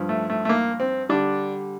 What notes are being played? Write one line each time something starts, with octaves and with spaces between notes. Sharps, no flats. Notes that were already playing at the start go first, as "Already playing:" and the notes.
Already playing: G2 F3
A3
A3
A3
A#3
C4
D3 G3 D4